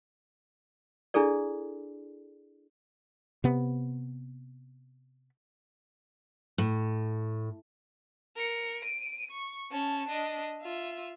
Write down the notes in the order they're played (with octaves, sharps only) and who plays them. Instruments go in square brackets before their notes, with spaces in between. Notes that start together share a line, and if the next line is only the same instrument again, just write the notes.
[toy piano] D4 E4 G#4 A4 D5
[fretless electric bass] C3 B3
[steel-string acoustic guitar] A2
[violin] A#4 C#7
D7 D#7
C#6
C#4 A5
D4 D#5
F4 E5